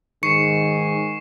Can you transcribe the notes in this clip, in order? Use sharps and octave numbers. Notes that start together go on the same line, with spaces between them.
G#2 D#3 C#6 C7 C#7 E7